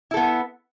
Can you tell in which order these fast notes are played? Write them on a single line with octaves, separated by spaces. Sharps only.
E4 A4 B3